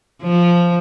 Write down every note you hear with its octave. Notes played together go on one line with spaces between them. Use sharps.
F3